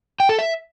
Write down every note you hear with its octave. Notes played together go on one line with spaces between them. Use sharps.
G5
A4
E5